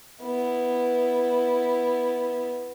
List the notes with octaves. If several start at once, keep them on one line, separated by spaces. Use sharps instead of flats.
B3 E4